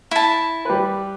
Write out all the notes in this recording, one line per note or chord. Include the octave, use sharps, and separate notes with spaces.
E4 A5
G3 B4